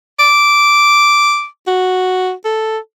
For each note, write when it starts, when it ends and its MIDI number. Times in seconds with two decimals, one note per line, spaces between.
0.19 1.46 86
1.67 2.32 66
2.45 2.78 69